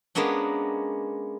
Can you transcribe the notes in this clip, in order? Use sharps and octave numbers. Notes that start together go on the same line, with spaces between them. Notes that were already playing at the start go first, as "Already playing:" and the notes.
G#3 A#3 B3 C#4 D4